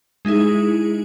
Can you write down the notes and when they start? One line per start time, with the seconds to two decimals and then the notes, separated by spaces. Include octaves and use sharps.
0.25 G#3 D#4 E4 G#4